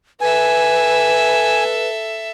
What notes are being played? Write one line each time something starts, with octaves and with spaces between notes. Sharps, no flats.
A4 B4 E5 G#5